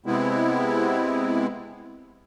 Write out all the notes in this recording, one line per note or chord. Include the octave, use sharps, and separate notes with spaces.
C3 G#3 B3 C4 E4